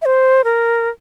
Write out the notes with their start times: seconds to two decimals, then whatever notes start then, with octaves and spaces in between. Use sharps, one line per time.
0.02 E5
0.05 C5
0.44 A#4